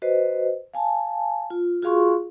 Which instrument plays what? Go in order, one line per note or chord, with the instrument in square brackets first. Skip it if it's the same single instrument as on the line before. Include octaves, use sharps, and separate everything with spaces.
[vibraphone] F#4 B4 C5 D#5
F5 G#5 A5
F4
F4 F#4 G#4 F5 C6 C#6